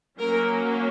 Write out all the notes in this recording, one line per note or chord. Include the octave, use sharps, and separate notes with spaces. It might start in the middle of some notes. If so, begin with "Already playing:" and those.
F#3 A#3 C#4 A#4